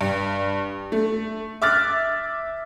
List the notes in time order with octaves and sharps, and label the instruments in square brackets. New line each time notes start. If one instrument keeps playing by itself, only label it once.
[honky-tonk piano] G2
A3
E5 D6 F6 F#6 A6